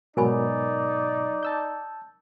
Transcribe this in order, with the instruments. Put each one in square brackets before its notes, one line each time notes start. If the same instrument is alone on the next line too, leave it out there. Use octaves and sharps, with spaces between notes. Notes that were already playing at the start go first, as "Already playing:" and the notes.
[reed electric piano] G#2 B2 F#3 [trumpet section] D#4 D5 [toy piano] A#4 G#5 B5
[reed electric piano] A5 E6 G6